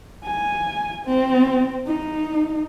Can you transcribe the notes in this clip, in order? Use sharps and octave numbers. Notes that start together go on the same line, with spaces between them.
G#5
C4
D#4